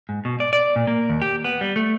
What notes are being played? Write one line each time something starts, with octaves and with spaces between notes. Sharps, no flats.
G#2
B2
D5
D5
A#2
A#3
D#2
G4
B3
G3
A3